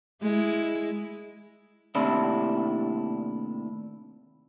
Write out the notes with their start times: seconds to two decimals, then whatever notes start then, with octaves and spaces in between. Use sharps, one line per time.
0.23 G#3 E4
1.95 D#2 A2 C3 D4 E4